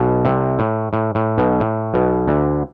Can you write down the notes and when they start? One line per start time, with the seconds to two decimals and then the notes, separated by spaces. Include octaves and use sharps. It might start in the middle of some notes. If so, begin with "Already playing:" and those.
Already playing: B1 B2
0.25 C2 C3
0.59 A2
0.93 A2
1.15 A2
1.38 B1 B2
1.60 A2
1.94 B1 B2
2.28 D2 D3